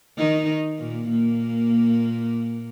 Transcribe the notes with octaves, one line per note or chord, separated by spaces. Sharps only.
D#3 D#4
A#2 A#3
A#2 A#3